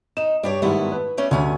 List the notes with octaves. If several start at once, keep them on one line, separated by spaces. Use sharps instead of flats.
D#4 E7
G2 D4 G4 C#5
G#2 D#3 G3 A3 B3 E4
B4
G3 A3 C#4
D2 G2 C#4 G#5